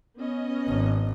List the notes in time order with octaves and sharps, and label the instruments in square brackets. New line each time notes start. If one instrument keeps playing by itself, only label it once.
[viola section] B3 C#4 D#5
[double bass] G#1